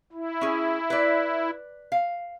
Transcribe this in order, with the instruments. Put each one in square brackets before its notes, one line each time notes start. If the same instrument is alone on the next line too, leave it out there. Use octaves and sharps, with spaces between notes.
[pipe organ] E4
[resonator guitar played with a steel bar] C#4 G#4
B4 D5
F5